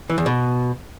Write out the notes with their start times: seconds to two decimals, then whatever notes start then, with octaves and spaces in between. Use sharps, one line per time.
0.10 E3
0.18 E2
0.26 B2